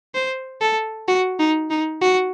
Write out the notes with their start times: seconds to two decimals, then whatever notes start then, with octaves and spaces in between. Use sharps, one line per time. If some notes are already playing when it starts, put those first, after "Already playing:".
0.15 C5
0.61 A4
1.08 F#4
1.39 D#4
1.70 D#4
2.01 F#4